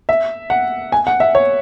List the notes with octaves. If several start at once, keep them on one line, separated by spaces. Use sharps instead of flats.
E5
F#5
G#5
F#5
E5
C#5